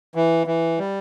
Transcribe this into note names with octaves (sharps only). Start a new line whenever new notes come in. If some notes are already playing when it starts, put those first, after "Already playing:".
E3
E3
G3